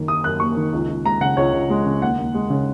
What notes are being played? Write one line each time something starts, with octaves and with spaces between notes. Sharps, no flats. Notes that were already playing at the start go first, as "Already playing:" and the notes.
Already playing: F#2 D#3 A#3
D#4 D#6
F#2 F#6
A#3 C#6
D#3
C#2
C#2
G#3 A#5
C#3 F#5
C#2 C#5
C#2
G#3
C#3
D#2 F#5
D#2
G#3
C#3